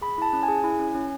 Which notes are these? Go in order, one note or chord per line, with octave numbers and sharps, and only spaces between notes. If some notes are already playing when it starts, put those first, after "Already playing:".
G#4 B5
E4 A5
C#4
G#5
G#4
E4
C#4
C#4